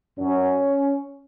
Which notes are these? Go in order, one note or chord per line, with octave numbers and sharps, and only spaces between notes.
F#2 F#3 C#4